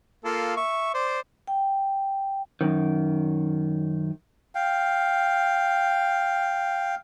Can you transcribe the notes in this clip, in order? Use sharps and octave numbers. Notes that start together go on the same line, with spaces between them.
A#3 F4 A4
E5 C#6
C5 D5
G5
F#2 D#3
F5 G5